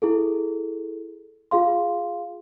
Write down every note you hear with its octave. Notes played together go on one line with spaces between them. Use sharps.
E4 G#4 A4
F4 G#4 F5 C6